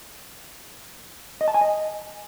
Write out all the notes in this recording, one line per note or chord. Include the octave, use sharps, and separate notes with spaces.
D#5
A5
G#5
D#5